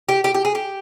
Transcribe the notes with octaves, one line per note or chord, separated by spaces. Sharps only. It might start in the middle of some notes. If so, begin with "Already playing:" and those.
G4
G4
G4
G#4
G4